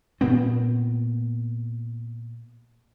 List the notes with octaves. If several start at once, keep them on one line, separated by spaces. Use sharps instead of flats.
A#2 B3 C4